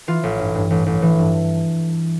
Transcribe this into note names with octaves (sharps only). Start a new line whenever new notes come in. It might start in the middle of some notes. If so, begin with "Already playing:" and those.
E3 F4
A1
G2
G2
A1
A1
E3
G2